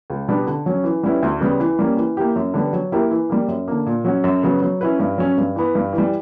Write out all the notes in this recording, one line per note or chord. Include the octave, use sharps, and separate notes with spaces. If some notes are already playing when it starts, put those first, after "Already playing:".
C#2
B2 G3 B3 D4
D3
F#3 C#4
E3
G3 C#4 E4 B4
D2
C#3 G3 B3
E3
G3 A#3 C#4
E3
A#3 E4 G4
F#2
D3 G3 B3
F#3
A#3 E4 G4 A#4
E3
G3 A#3
F#2
D3 A#3
A#2
F#3 C#4 F#4
F#2
C#3 F#3 B3
F#3
C#4 E4 B4
G2
F#3 C#4
G2
E3 B3
G2
E3
G3